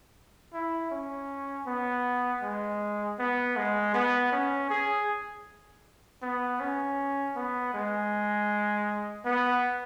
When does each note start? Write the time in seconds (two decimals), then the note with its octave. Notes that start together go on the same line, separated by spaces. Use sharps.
0.53 E4
0.91 C#4
1.67 B3
2.43 G#3
3.19 B3
3.57 G#3
3.94 B3
4.32 C#4
4.70 G#4
6.23 B3
6.60 C#4
7.36 B3
7.74 G#3
9.25 B3